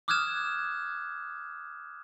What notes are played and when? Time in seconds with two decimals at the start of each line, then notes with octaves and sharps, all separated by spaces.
0.08 D6 D#6 F6 F#6 G#6 E7